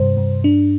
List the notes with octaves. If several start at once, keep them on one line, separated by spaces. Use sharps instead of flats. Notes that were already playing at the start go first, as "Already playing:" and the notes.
Already playing: G2 C3 C5
G2
D4